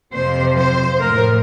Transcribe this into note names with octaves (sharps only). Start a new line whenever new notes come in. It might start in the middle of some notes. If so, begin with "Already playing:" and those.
F2 C3 F3 C5
C5
A2 F3 A#4